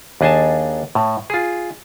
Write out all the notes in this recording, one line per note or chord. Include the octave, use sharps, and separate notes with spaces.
D#2 D4 G#4 D#5 G#5 A5
A2
F4 G#4